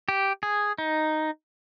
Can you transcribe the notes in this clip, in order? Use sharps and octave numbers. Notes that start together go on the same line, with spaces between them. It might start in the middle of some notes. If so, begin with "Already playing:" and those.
G4
G#4
D#4